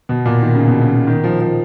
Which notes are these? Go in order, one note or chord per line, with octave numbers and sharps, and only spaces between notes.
B2
A#2
D#3
C#3
B2
C#3
D#3
F3
F3